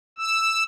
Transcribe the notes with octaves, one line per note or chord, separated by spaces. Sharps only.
E6